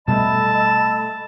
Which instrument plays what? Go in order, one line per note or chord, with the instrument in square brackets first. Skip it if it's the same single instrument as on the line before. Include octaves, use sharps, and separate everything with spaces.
[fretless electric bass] B2 G3 [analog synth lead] A3 [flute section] D#5 B5 E6 [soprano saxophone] A5